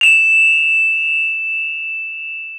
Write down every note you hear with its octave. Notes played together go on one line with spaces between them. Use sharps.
E7 F7